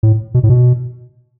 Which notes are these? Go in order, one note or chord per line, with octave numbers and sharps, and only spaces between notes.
A2
B2
A2
B2